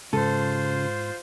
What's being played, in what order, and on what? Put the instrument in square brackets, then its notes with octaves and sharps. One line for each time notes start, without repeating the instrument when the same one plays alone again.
[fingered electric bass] G#2 G#3 [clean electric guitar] C#3 [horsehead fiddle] F4 C5 [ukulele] A4